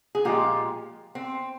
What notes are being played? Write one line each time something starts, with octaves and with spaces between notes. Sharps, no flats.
G#4
A#2 F3 G#3 F4 G4
C4